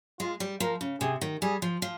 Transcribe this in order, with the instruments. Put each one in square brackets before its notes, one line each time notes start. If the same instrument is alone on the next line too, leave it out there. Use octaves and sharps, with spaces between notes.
[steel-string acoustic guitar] G#3 [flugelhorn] F4
[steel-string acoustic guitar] G3
[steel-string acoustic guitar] F3 [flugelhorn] A#4
[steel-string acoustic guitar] C#3
[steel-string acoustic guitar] C3 [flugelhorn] G#4
[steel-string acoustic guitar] D#3
[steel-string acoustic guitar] G3 [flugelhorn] G#4
[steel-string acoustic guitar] F3
F3